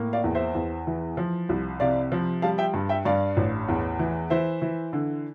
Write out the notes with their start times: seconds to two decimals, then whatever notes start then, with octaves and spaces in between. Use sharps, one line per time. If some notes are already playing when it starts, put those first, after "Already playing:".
Already playing: A2 A#3
0.13 D5 F5
0.24 E2
0.35 C5 E5
0.55 E2
0.87 E3
1.17 F3
1.49 C2
1.80 C3 D5 F5
2.12 F3
2.42 G3 F5 A5
2.58 E5 G5
2.74 G2
2.89 E5 G5
3.05 G2 D5 F5
3.37 A1
3.68 E2
3.99 E3
4.30 E3 C5 E5
4.62 E3
4.93 D3